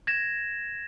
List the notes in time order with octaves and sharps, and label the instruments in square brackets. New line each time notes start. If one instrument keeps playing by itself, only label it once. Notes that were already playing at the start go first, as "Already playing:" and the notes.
[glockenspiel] G#6 A#6 E7